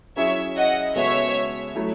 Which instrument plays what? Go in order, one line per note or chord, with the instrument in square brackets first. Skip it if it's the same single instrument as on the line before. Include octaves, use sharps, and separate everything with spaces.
[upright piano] F#3 C#4 E4 G#4 [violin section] C#5 E5
[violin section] D#5 F#5
[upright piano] C#3 G#3 B3 F#4 A4 [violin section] C#5 E5
[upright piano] F#3 A3 E4